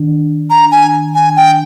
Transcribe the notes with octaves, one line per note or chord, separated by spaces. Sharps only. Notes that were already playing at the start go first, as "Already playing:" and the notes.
Already playing: D#3 D4
A#5
G#5
G#5
G5